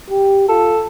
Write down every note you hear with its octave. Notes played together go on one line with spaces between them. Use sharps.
G4
F4 A4